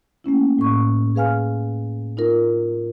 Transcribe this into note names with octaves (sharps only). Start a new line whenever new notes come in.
A3 A#3 C#4 E4
A2 C#6
G#4 B4 F5 G#5 F6
D#4 F4 A#4